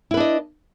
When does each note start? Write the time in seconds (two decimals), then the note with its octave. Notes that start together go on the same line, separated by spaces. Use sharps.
0.11 E4
0.14 B4
0.17 D4
0.20 D#5